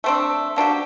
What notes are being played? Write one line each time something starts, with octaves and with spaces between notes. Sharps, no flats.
A3 C4 D4
A#3 D4 F#4 G4